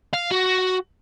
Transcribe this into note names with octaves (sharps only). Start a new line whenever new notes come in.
F5
F#4